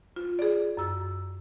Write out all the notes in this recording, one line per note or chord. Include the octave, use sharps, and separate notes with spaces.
F4
G#4 D5
F#2 E6